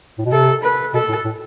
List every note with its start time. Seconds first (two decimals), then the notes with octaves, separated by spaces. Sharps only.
0.18 A2
0.25 B2
0.32 C3 A4
0.63 B4
0.94 B2 A4
1.09 A2
1.25 A2